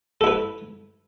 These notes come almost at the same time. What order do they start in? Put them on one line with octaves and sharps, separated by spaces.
A4 E4 B4